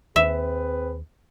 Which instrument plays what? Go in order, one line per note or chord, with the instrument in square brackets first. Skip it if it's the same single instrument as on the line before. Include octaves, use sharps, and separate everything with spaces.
[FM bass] D#2 [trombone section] C4 G#4 B4 [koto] E5